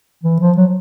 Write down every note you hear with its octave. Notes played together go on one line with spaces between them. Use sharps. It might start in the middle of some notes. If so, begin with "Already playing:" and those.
E3
F3
F#3